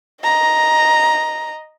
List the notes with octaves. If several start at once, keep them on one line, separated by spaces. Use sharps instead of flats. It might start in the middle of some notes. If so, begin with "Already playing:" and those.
D#5 A#5